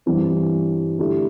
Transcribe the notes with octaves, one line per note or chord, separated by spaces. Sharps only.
G2 E3 C4
D3 A3 E4 G4